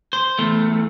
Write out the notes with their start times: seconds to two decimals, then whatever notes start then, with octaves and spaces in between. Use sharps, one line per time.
0.13 C5
0.39 E2 A3